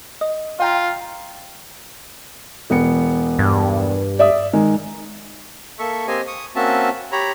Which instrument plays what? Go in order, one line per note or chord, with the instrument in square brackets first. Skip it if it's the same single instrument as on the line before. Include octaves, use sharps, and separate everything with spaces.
[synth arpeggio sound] D#5
[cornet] F4 [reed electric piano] F5 G5 A#5
[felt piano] E1 B3 C#7
[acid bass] G2
[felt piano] D5 E5 D#6
D#3 G#3
[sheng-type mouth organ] A#3 A4 E5 C#6
A#3 C4 G4 C5 D#5 G#5
C#6 D#6
A#3 C4 C#4 F#4 E5 A5
G4 C#5 A#5 B5